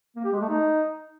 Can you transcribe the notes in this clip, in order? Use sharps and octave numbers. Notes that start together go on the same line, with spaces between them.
A#3
G4
G#3
A3
D#4